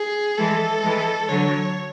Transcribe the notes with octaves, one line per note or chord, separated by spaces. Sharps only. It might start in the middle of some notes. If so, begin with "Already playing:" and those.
Already playing: G#4
E3 G#3 A4
E3 G#3
D3 F#3 C#5